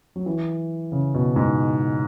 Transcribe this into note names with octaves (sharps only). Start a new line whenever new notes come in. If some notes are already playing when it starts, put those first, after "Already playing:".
F#3
E3
C#3
B2
G#2